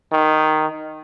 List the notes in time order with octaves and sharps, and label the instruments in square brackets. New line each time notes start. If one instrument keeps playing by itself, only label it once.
[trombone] D#3